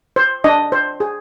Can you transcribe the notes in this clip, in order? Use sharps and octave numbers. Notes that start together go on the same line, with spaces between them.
C5
D4 D#5
C5
G#4